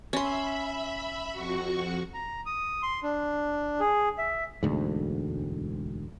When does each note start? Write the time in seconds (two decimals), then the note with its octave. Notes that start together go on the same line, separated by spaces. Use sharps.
0.13 C#4 E5 B5 C6
1.32 F2 F#4 C#6
2.14 A#5
2.46 D#6
2.83 C6
3.03 D4
3.80 G#4
4.18 E5
4.63 E1 D2 G#2